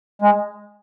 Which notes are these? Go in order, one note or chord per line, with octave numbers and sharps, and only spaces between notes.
G#3